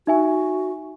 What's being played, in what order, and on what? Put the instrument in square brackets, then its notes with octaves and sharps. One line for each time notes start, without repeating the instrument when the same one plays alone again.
[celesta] D#4 E5 G#5 [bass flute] F#4